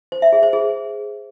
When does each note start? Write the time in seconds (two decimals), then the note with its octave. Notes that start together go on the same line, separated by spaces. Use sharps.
0.12 C5
0.22 E5
0.33 G#4
0.43 C5
0.53 G#4